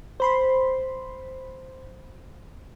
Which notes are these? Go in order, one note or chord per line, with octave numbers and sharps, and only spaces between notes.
C5 B5 C6